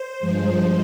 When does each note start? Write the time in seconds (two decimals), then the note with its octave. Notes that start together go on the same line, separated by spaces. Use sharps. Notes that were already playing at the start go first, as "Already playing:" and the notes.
Already playing: C5
0.20 G2 F3 G#3